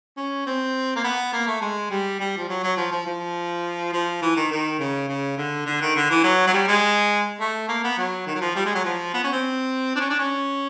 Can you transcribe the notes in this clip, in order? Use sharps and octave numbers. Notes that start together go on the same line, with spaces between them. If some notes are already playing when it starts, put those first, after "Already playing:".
C#4
C4
A#3
B3
A#3
A3
G#3
G3
G3
F3
F#3
F#3
F3
F3
F3
F3
E3
D#3
D#3
C#3
C#3
D3
D3
D#3
D3
E3
F#3
F#3
G3
G#3
A3
A#3
B3
F#3
D#3
F#3
F3
G3
G#3
F#3
F3
B3
C#4
C4
D4
C#4
D4
C#4